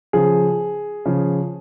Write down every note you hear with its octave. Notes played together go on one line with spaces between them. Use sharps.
C#3 F3 G#4
C#3 F3